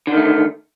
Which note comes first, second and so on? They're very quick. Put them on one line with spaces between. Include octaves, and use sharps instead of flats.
D3 D#3 A3